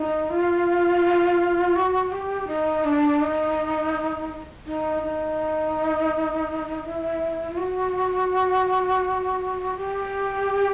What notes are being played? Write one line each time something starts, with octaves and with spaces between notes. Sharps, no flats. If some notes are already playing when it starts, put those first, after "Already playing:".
Already playing: D#4
F4
F#4
G4
D#4
D4
D#4
D#4
D#4
E4
F4
F#4
G4